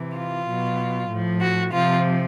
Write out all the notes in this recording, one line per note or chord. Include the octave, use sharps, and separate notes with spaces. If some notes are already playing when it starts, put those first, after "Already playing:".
Already playing: C3 E3
F4
B2 F#3
A2 F3
F#4
C3 F3 F4